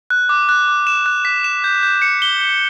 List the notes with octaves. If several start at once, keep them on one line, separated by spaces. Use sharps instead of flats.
F#6
D6
F#6
D6
E7
F#6
B6
E7
G6
G6
C#7
G7
G7